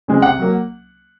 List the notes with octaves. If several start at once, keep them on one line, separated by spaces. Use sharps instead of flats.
C#3 G#3 C4
C3 F#5
F#3 A#3